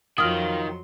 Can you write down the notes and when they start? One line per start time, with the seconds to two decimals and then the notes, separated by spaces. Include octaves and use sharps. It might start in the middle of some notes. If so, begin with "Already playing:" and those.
0.18 F2 D#3 F#3 F4 C6 D#6 F6